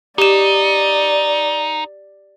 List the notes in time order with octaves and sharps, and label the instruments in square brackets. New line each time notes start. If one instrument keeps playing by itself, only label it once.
[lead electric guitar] D#4 [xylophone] G4 E7 [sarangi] D5